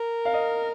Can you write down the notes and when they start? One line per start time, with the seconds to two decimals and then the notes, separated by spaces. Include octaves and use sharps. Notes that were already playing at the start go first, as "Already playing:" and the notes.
Already playing: A#4
0.25 F5
0.34 D#5